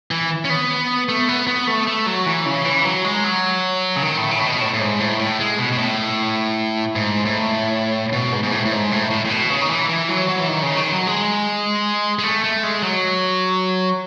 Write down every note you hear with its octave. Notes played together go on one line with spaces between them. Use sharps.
E3
C#4
B3
A3
B3
B3
A3
A3
F#3
E3
C#3
E3
F#3
G#3
F#3
C#3
D#3
A2
C#3
A2
B2
A2
A2
G#2
A2
A2
G#3
B2
B2
A2
G#2
A2
B2
G#2
G#2
A2
A2
G#2
A2
A2
A2
B2
C#3
D#3
E3
E3
F#3
F#3
E3
D#3
C#3
D#3
F#3
G#3
G#3
A3
A3
G#3
F#3